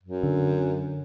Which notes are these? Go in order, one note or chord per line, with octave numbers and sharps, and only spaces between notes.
F#2
D3